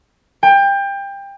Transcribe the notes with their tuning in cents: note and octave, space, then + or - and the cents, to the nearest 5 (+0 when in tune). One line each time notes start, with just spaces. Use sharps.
G5 +25